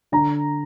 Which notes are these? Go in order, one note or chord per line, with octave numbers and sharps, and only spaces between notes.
D3 A#5